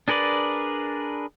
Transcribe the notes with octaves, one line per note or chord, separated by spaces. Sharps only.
D4 G#4 A#4 B4 D5